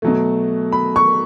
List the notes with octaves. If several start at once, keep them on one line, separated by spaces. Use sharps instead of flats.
B2 F#3 A3
B5
C#6